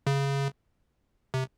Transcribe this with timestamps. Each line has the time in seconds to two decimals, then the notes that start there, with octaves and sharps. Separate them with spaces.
0.07 C#3
1.34 C3